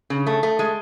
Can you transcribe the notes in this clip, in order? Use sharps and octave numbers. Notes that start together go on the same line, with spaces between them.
C#3
A3
A3
G#3